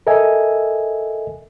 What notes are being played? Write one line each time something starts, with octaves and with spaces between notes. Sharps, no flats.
A4 A#4 D#5 E5 G#5